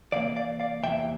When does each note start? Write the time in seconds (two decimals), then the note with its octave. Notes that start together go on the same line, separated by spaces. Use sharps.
0.12 E2 C3 E3 A#3 D5 F5
0.36 D5 F5
0.60 D5 F5
0.83 E2 C3 E3 A#3 E5 G5